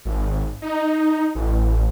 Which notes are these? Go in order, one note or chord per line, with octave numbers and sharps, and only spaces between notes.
G#1
D#4
A1